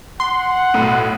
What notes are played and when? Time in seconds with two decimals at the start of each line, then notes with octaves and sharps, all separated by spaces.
0.20 F#5 C6
0.74 B1 A2